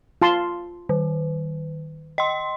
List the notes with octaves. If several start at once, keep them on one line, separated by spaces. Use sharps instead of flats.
F4 A5 C6
D#3
D#5 C6